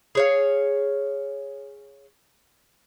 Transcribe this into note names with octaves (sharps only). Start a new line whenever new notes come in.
G#4 C#5 F5